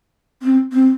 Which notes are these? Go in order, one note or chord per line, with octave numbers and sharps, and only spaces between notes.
C4
C4